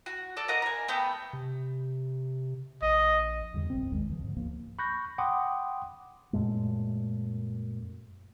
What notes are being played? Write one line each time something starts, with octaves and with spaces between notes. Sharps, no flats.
F#4
A4 D5
A#4 D#5 F#5 A#5
A#4 G#5
A3 B3 G5 G6
C3
A#1 D#5
E2 G2 D3
F1 A#1 F#2 C4
G#1 D#2 D#3 G#3
C#2 F3
G#2 D3
D2 F3 A#3
B5 C#6 F#6 G6 A#6
F#5 G5 B5 C6 D6 D#6
F#2 A#2 G#3 A3